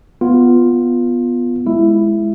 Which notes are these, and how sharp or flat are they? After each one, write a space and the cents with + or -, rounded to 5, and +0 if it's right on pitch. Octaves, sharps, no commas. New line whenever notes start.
B3 +0 F4 +0
G#3 +5 E4 +10